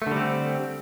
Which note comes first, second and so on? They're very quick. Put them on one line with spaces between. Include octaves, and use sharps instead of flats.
A3 D3 G3 C4